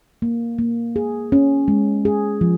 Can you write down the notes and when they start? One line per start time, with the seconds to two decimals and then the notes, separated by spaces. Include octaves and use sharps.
0.22 A#3
0.59 A#3
0.96 G#4
1.32 C#4
1.68 G#3
2.05 G#4
2.41 F3